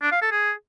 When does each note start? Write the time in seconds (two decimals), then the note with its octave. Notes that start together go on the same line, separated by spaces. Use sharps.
0.02 D4
0.12 F5
0.21 A4
0.31 G#4